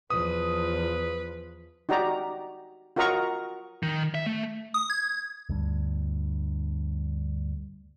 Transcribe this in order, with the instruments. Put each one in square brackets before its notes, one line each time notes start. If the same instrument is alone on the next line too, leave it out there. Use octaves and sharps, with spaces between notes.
[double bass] E2 F3 [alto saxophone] B4 [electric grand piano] D#6
[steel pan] D#4 F#4 G4 D5 A#5
F4 F#4 A#4 D#5 A#5 C#6
[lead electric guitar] D#3
E5
A3
[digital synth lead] D#6
G#6
[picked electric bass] D2 G2